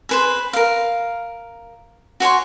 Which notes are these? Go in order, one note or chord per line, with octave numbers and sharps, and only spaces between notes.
G#4 B4 C5
A#4 F5
F#4 C#5 G#5 C6